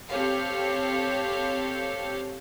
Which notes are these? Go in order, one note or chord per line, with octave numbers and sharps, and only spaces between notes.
C4 G4 A4 C#5 F5